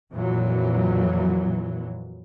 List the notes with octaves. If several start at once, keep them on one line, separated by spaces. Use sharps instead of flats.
F2 A#2 E3 F#3